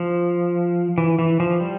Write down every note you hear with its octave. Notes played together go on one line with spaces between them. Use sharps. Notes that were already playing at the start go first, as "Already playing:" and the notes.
Already playing: F3
E3
E3
F3
G3